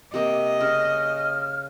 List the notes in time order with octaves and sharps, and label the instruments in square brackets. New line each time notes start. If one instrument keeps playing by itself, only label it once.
[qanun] C3 A#3 [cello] D#5
[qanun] C#3 [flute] F6